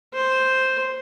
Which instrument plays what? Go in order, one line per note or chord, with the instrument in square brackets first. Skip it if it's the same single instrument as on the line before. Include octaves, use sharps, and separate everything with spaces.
[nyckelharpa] C5